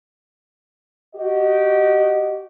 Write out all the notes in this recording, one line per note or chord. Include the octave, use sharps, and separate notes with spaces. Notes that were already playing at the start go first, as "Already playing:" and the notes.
F#4 G4 D#5